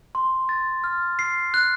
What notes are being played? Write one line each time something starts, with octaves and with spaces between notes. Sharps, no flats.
C6
A6
F6
C7
F#6